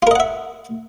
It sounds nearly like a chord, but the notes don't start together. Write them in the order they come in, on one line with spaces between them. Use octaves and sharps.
F4 A#4 D#5 F#5 E5